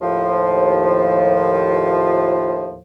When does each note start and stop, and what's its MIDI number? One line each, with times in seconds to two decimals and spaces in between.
0.01 2.77 39
0.01 2.77 45
0.01 2.77 53